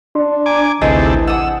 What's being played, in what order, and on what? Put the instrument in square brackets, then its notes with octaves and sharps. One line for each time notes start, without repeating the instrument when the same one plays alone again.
[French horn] D4 [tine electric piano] C6
[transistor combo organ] G#5 D6 [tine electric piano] A#5
[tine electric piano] A1 [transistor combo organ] D2 C3 A4 [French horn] E3 [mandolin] D#4 G#4 B4
[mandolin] F#5 D#6 [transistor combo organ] E6